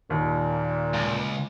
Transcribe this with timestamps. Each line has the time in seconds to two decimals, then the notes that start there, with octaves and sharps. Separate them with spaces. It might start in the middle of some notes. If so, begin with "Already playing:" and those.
0.10 D#2 A#2 A#3
0.94 C#2